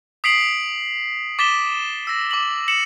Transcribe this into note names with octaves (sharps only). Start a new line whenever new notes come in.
D#6 B6 C7 D7 F#7
D6 A6 B6 E7 G7
E6 A#6
D6 F#7
C#7 E7 F#7